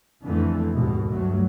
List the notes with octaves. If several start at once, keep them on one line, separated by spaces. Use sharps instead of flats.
F2 D3 E3 A3
D#2 G#2 B2
D2 G2 F#3 A3